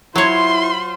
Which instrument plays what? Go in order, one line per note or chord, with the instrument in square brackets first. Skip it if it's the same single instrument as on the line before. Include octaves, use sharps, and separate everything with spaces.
[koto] F#3 C#5 [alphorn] E4 [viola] F4 C5 [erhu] C6